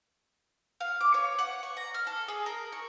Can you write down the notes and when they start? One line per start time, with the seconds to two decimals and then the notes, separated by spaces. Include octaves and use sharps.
0.81 F5
1.00 D6
1.14 C#5
1.39 F#5
1.63 C#6
1.77 A#5
1.94 F6
2.07 A4
2.28 G#4
2.46 A#4
2.72 C#6